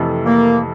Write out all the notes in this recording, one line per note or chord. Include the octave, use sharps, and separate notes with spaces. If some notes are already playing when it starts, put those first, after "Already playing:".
Already playing: F2 C3 E3 A3
A#3